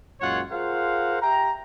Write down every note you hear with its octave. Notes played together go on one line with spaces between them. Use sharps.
F#2 A#2 G#3 F4 C#5 F#5
F4 G#4 A#4 C5 F5 F#5
G4 E5 G5 A#5